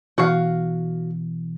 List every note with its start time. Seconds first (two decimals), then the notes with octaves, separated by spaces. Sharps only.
0.18 B2 E3 F#4 F5